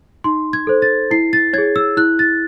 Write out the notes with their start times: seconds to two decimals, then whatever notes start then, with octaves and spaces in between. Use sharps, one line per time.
0.24 D#4 C6
0.53 G#6
0.67 A4 C5
0.82 A6
1.11 E4 C7
1.33 A6
1.53 G#4 C#5 G#6
1.76 E6
1.97 E4 F#6
2.19 A6